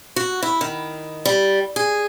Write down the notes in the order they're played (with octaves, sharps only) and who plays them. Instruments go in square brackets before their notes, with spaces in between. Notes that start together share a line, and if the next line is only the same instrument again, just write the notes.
[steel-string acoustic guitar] F#4
E4
D#3
G3
G#4